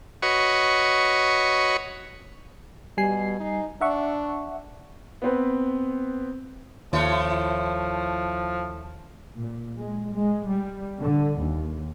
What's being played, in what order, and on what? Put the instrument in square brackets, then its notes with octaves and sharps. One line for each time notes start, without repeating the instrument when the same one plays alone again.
[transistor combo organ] F#4 B4 C#5 D#5 C#6
[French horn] B2 [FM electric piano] G3 G#5 C7
[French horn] D#4
[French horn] D4 [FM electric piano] E5 F#5 C#6
[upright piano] B3 C4 B4
[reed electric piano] D#2 [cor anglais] F3 [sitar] A3 E4 C#5
[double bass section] A#2
G#3
G#3
G3
D3
D#2